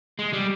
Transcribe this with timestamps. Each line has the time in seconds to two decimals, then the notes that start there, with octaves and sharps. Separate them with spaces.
0.19 G#3
0.33 G3